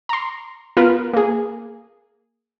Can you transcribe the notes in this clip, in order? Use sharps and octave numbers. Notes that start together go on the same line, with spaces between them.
A#5 C6
B3 F4 A#4 B4
A#3 G#4